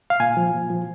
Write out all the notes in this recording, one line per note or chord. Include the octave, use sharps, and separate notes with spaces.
F5
A#2 G#5
F3
A#2
F3